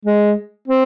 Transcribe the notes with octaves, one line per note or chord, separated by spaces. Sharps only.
G#3
C4